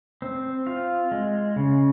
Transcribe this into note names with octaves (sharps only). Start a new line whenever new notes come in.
C4
F4
G#3
C#3